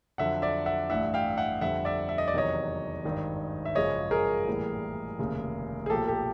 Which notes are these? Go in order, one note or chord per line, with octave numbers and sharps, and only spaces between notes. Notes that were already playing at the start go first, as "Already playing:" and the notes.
F2 D3 F#3 E5 F#5
D5 E5
E5 F#5
A1 G2 E3 E5 F#5
F5 G5
E5 F#5
F2 D3 G3 E5 F#5
D5 E5
E5
D#5
D5
E2 C3 D#3 F#3 C#5 D#5
G#1 G2 D#3
E5
G#1 F#2 C#3 F3 G#3 C#5 D#5
G#4 A#4
A#1 A2 E3 G3
F1 D#2 C#3
G#4
B1 A#2 F3 G4 A4
G4 A4